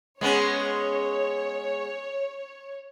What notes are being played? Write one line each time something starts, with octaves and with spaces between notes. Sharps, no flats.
G#3 B3 C#4 C#5